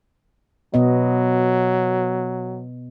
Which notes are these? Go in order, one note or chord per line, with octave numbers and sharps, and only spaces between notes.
B2 F#3 B3 D#5